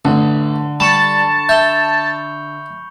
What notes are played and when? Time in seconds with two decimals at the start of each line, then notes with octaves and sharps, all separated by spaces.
0.05 A1 D3 A5
0.80 G3 A5 B5 C#6 C#7
1.49 E5 G6 F7 G7